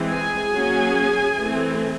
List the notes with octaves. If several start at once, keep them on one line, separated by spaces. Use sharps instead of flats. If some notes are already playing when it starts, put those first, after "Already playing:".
Already playing: E3 G#3 C4
G#4 G#5
F#3 A#3 C#4
E3 A3 C4